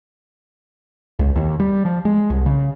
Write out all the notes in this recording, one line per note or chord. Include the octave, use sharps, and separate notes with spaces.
C#2
D#2
G3
F3
G#3
C2
C#3